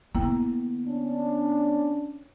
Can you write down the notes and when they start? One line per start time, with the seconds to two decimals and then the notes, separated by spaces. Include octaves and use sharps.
0.15 D3 A#3 B3 E4 G5
0.87 C#4 D4